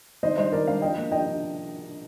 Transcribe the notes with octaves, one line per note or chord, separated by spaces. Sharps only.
D#3 C5 D#5
G3 D4 C5 D#5
D#3 A#4 D5
G3 D4 D5 F5
F3 D#5 G5
A#3 D4
F3 D#5 G5
D4